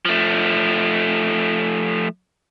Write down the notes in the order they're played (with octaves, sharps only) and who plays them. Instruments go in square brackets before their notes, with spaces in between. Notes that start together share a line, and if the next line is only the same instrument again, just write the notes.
[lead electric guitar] F3 A3